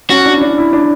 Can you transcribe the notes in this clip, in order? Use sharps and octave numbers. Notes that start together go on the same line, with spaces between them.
C#4 F#4
D4
E4
D4
E4
D4